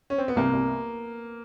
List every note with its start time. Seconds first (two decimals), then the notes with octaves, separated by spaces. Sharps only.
0.10 C#4
0.18 C4
0.28 B3
0.36 C2 A#3
0.53 C2